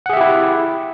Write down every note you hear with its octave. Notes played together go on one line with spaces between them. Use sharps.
E4 G4 G#4 E5 F#5